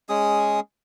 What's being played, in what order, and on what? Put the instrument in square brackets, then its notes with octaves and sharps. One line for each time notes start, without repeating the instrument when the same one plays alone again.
[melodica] G#3 C#4 G#4 D#6